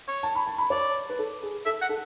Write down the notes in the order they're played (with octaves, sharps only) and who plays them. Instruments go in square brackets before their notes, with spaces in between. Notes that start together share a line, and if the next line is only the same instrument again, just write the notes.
[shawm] C#5
[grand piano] A5
B5
A5
B5
[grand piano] C#5 [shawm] D5
[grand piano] B4
A4
G#4
[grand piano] A4 [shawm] E5
[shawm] F#5
[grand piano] A4